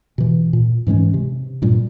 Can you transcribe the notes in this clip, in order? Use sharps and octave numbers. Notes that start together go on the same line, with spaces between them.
B2 E3
A#2
G#2 E3 G#3 C#4
C3
G2 A#2 G3